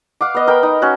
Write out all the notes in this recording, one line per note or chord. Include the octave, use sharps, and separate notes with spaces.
F5 F#5 D6
B3 D#5
A#4 G5 B5
D#4
C#4 F#4